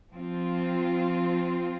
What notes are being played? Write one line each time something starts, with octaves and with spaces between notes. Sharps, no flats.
F3 C4 F4